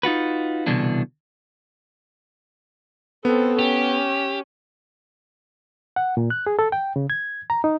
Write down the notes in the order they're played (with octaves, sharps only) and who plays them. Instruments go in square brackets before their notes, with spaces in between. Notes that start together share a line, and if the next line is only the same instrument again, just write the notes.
[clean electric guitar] D#4 F4 F#4 B4
C2 B2 D3 E3 D4
[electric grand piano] B3 [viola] C4 A4
[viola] C#4 [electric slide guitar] G4
[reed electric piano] F#5
A#2
F#6
G#4
A4
G5
C#3
G#6
A#5
D#4